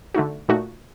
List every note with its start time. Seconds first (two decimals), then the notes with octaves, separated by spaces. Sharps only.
0.15 D3 A3 D#4 F#4
0.48 A#2 A3 D#4 F#4